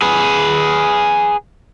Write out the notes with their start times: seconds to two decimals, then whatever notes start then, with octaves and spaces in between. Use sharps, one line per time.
0.02 G#4 B4